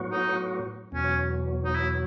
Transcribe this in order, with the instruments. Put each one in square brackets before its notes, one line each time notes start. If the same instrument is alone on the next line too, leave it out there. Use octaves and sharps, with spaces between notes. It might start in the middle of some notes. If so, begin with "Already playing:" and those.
Already playing: [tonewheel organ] A2 F#3 B3 F#4
[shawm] D#4
[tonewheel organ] E2 B2 F#3 [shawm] C#4
[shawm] D#4
E4